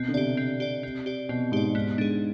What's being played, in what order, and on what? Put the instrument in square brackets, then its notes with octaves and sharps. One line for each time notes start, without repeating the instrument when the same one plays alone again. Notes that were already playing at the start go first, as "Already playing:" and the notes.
Already playing: [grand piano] B2 [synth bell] C4
[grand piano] D3
[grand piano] C3 [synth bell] G4 D5
[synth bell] C4
G4 D5
C4
G4 D5
[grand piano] B2 [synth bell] C4
[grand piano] G#2 [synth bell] G4 D5
[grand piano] G#2 [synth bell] B3
[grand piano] G#2 [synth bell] D4 G#4